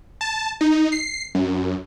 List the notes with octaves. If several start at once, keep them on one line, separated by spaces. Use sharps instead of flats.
A5
D#4
C7
F#2